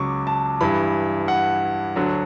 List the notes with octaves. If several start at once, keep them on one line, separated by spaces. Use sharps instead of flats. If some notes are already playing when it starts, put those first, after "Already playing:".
Already playing: C#2 C#3 F#3 C#6 D6
A5
G2 E3 B5
F#5
D2 D3 F#3